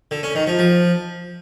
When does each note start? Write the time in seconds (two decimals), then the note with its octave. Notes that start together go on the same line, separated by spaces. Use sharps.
0.11 D3
0.23 C#4
0.35 D#3
0.47 F3
0.59 F3